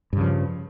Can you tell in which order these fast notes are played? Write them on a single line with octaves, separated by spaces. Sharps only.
G2 C#3 F3